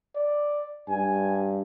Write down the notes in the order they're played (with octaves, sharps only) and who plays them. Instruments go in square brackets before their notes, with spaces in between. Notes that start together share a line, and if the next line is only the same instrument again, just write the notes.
[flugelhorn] D5
[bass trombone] G2 [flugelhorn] G#5